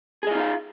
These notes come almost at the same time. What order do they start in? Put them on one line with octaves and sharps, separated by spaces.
G#4 D#5 F4 D#4 F5